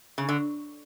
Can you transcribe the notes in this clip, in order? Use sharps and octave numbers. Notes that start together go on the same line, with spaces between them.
C#3
D3